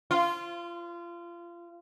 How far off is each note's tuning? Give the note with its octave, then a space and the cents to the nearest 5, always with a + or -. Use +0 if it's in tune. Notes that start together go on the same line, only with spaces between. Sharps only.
F4 -25